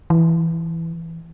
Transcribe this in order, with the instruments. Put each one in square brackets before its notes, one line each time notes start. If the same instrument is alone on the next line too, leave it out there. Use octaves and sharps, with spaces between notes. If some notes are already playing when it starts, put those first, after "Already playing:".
[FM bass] E3